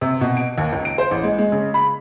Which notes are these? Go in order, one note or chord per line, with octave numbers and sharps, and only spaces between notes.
C3
B2
D7
D#2
C#2
D7
C5
A1
G#3
G#3
C#3
B5